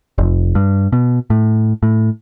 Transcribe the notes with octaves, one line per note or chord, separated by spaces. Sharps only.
F1
G2
B2
A2
A2